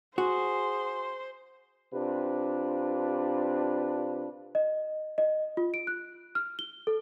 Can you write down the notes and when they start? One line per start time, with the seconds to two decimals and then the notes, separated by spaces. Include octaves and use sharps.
0.18 F#4 G#4 C5 C6
1.92 C3 D4 F4 B4
4.55 D#5
5.18 D#5
5.57 F4
5.74 D7
5.87 F#6
6.35 F6
6.59 G7
6.87 A4